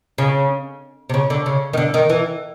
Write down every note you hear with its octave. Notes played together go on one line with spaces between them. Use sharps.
C#3
C3
C#3
D3
C#3
D#3
D3
D#3
E3